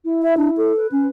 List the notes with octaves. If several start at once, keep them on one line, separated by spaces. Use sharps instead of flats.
E4
E5
D4
A4
B4
C#4